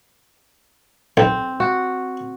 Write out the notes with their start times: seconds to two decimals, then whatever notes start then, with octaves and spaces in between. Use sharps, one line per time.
1.17 B1 C4
1.60 F#4